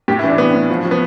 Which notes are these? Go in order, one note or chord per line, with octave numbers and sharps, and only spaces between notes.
A2 G4
E4
E3 D4
A2 B3
A2
F3
F3
B3